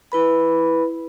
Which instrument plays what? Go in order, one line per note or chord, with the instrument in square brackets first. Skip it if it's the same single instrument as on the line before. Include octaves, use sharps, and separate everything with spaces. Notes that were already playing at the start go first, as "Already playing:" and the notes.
[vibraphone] E4 B4 B5